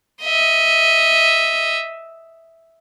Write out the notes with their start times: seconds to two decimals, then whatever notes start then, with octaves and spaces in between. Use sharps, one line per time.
0.22 D#5 E5